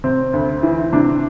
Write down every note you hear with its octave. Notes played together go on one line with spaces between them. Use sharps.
C3 C4
D2
E3
C3 D4